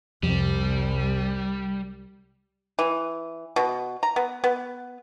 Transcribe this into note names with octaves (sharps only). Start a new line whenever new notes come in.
C2 F2 G3
E3
B2
A#5
B3
B3